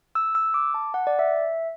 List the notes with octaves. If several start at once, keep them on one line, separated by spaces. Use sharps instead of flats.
E6
E6
D6
A5
F#5
D5
E5